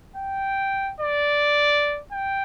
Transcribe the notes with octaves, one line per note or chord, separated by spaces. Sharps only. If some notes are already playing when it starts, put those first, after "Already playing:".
G5
D5
G5